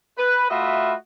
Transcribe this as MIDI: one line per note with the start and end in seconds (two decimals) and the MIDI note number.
0.18 0.46 71
0.50 0.93 57
0.50 0.93 65
0.50 0.93 66
0.50 0.93 75
0.50 0.93 76
0.50 0.93 83